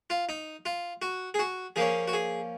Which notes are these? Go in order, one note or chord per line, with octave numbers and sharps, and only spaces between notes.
F4
D#4
F4
F#4
G#4
F#4
F3 A#3 C#4 G#4
F#4
G#4